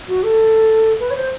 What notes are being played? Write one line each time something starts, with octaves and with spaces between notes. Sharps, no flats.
F#4
A4
B4
C#5
C5